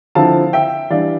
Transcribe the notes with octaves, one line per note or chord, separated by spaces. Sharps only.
D3 F3 C4 E4 F5 A5
E5 G5
E3 G3 D4 D5 F5